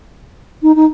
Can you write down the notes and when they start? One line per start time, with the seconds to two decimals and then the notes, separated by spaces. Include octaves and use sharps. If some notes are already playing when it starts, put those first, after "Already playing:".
0.62 D#4
0.76 D#4